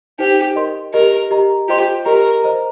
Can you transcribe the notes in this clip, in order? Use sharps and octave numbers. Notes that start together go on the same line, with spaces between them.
D#4 G4 C5 G5
A#4 D#5 C6
G4 A#4 D#5 A#5
G4 D#5 A#5
F4 G4 C5 D#5 C6
G4 A#4 D#5 A#5
C5 D#5 A#5